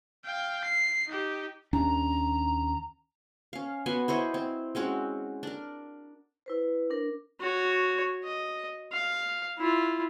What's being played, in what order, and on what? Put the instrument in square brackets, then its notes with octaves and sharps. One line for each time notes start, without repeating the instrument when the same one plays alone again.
[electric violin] F5 G5
C7
D#4 G4
[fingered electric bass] D#2 C#4 D4 [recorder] A#5
[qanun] C#4 F5
B3 F#4 G#5 C6
E4 C5 C#5 D#5
C4
G#3 C4 C#4 F#4
D4 A#4
[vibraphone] E4 B4 C5
D4 A#4
[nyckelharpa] F#4 C#5
D#5
F5
E4 F4